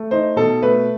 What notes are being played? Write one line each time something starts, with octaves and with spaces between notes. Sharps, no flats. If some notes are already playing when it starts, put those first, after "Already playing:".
Already playing: A3
D#4 C5
B2 A4
A3 B4